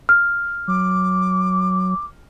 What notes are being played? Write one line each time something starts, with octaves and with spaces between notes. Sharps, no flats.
F6
F#3 D6